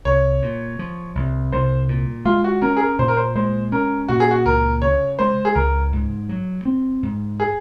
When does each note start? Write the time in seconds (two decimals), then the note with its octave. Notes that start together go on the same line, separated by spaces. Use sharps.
0.05 C2 C#5
0.42 A#2
0.79 F3
1.15 C2
1.52 C2 C5
1.89 A#2
2.25 G#3 F4
2.44 F#4
2.62 C#4 A#4
2.77 G#4
2.80 A#4
2.99 A#2 C5
3.08 A#4
3.17 C5
3.35 G#3 C5
3.72 C#4 A#4
4.08 A#2 F#4
4.20 G#4
4.31 F#4
4.45 C#2 A#4
4.82 C#3 C#5
5.19 G#3 C5
5.45 G#4
5.55 C#2 A#4
5.92 G#2
6.29 F#3
6.65 C4
7.03 G#2
7.40 G#4